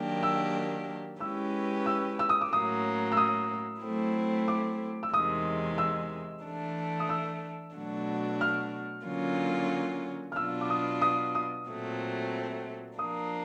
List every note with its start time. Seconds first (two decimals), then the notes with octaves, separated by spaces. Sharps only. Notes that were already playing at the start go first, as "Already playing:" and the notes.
Already playing: D#3 F#3 A#3 D4 G4
0.23 E6
1.20 G#3 C#4 E4 G4 B4 E6
1.86 E6
2.19 E6
2.29 D#6
2.41 D6
2.52 A2 F#3 A#3 C#4 D#6
3.12 E6
3.17 D#6
3.82 F#3 A3 C4 E4
4.48 D6
5.03 E6
5.13 E2 C3 D#3 G#3 D#6
5.78 E6
6.44 E3 A3 D4
7.00 D#6
7.09 E6
7.75 B2 F#3 A3 D4 F#4
8.41 F6
9.06 D3 F#3 A#3 C#4 F4
10.32 F6
10.36 B2 F#3 B3 D4 F4 E6
10.61 D6
10.70 D#6
11.02 D#6
11.35 D#6
11.68 A#2 F#3 A3 C4
12.99 F3 A#3 D4 D#6